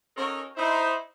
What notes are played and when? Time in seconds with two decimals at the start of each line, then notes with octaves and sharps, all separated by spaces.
0.17 C#4 D#4 F#4 A4 A#4
0.57 D#4 E4 C5